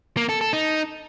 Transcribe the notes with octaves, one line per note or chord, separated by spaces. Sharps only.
A#3
A4
A4
D#4